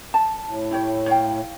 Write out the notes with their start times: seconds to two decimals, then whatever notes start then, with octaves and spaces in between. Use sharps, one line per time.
0.14 A5
0.44 A2
0.71 E4 G4 C#5
1.07 C#5 F5 G5